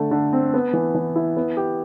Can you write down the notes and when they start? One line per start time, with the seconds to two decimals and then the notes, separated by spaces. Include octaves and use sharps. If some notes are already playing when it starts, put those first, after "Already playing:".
Already playing: D3 A3
0.11 D3
0.33 C4
0.54 B3
0.73 E3
0.94 E3
1.16 E4
1.37 B3
1.57 G4